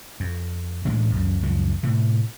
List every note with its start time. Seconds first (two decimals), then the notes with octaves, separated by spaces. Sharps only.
0.20 F2
0.85 A1 A2 G#3 D4
1.15 C#2 F#2
1.42 C#2 F#2 F3
1.83 A2 C3